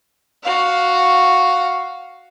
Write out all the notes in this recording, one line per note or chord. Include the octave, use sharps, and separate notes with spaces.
F#4 F5